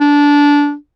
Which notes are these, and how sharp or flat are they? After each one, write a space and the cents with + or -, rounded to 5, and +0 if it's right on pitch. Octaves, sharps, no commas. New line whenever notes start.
D4 -15